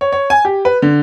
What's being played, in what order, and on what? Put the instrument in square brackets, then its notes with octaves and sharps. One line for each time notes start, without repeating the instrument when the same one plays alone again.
[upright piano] C#5
C#5
G#5
G4
B4
D3